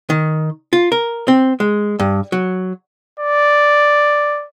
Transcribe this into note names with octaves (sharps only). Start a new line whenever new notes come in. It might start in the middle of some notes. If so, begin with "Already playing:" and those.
D#3
F4
A#4
C4
G#3
G2
F#3
D5